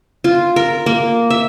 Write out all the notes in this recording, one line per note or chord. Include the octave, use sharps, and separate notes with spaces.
F4
A#4
A#3
E5